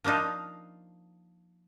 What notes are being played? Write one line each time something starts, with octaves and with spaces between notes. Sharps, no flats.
F3 A#3 D4 D#4 F4